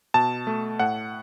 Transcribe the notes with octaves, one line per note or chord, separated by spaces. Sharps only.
B2 A5
A3
A2 F#5